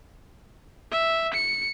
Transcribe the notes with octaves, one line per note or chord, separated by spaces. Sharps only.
E5
C#7